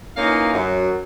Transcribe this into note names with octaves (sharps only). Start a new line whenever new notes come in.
E3 A#3 C#4 D#4 F4 F5
F#2